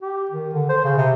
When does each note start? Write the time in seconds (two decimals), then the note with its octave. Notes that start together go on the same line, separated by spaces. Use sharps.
0.01 G4
0.31 D#3
0.54 D3
0.69 C5
0.84 C#3
0.97 C3